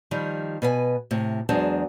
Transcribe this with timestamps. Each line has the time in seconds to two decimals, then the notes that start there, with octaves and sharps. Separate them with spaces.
0.11 D#3 F3 G3
0.62 B2 B4 E5 G#5
1.11 A2 C3
1.49 E2 F#3 G#3 D4 C5 A5